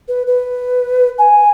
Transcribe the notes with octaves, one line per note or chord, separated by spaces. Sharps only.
B4
B4
G#5